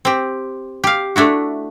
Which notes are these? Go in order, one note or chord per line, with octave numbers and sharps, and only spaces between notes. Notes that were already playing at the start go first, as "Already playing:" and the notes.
C4 G4
G4 F5
A3 D4 E4 F#4